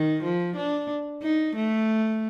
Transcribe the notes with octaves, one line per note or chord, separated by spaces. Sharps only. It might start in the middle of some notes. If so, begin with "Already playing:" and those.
Already playing: D#3
F3
D4
D#4
A3